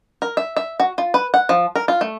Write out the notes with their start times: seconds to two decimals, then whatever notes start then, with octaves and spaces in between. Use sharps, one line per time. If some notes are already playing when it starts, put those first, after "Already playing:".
0.22 A#4
0.37 E5
0.57 E5
0.80 F#4
0.98 F4
1.14 B4
1.34 F#5
1.49 F3
1.76 A#4
1.88 F4
2.01 A3